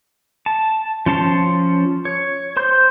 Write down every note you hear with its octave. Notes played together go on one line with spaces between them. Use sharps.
A5
F3 C#4 A5 C6
C#5
C5 C6 G6